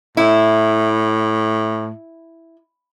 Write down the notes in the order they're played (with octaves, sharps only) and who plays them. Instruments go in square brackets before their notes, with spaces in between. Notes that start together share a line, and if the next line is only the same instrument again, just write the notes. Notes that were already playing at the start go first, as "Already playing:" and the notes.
[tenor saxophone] A2 [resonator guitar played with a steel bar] E4